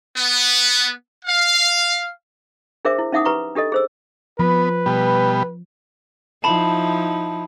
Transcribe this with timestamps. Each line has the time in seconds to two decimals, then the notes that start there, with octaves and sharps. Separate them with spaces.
0.17 B3
1.25 F5
2.85 D4 G#4 A#4 C5 E5 D6
2.99 E4
3.12 C#4 D#4 E5 F#5 D6 D#6
3.25 G4 B4 A#5 C#6
3.55 D4 G4 A4 D#5
3.72 G#4 C5 E6
4.39 F3 B3 B4
4.86 B2 G3
6.44 F3 D#4 E4 A5 B5